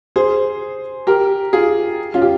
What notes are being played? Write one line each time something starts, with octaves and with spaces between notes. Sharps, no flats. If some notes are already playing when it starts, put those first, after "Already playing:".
G#4 C5
G4 A#4
F4 G#4
C#4 F4
G4